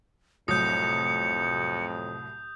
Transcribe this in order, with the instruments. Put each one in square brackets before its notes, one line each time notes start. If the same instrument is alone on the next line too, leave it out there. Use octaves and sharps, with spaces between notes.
[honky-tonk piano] C2 A2 F#3 [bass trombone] F2 [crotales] D#6 G6 [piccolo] C#7